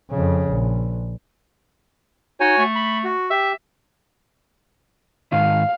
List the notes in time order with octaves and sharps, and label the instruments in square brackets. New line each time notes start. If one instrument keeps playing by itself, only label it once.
[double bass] F2 C#3
A#1
[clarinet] D#4 [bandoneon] F#4 C#5 G#5
[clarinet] A3
[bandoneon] B5
F#4
[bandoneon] G4 [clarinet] E5
[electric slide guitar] G#2 D#3 [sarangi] F5